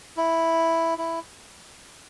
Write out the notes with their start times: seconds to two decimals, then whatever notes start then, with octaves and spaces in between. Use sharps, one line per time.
0.17 E4
0.98 E4